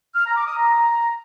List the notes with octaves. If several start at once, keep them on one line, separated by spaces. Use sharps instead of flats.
F6
A#5
D6
D#6
A#5